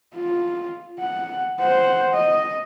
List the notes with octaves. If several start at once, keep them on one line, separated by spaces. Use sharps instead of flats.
F4
F#5
C5 F#5
D#5